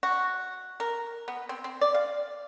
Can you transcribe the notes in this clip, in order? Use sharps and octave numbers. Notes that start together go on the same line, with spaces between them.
F#4
A#4
B3
C4
C4
D5
F5